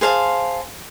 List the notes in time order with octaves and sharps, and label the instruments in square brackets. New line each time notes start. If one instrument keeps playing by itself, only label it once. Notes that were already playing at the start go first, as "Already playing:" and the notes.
[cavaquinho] G#4 C5 F5 A5